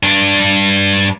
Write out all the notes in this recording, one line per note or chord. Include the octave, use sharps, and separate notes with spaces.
G2 D4